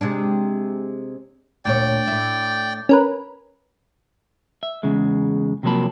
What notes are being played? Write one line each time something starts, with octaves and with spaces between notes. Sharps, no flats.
C3 G#3 D4
D2 A#2 C#5 D5 G5
A2 E4
C#4 A#4 B4
E5
E2 C#3 G#3
C3 F3 F#3 A#3 A5 B5